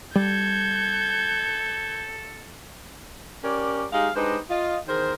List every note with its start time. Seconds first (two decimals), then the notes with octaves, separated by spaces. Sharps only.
0.16 G3 A4 G6 G#6
3.43 C#4 G4 A#4 C#5 D5
3.93 G#3 D#4 G4 G#4 F5
4.15 G#3 D4 D#4 G4 B4 C5
4.49 F4 D#5
4.87 E2 D#3 G#4 A#4 C5